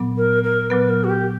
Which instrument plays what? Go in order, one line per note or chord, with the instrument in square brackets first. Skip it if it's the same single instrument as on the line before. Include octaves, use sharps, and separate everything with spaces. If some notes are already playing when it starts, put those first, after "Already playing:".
Already playing: [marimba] A#2 F#3 B3
[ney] A#4
A#4
[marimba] A#2 F#3 B3 [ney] B4
[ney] A#4
F#4
G4